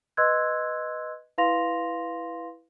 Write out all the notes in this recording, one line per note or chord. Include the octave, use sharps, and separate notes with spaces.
B4 D#5 C6 E6 F#6 G#6
E4 B4 F5 C6 A#6 F7